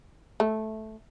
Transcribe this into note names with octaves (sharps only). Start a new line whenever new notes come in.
A3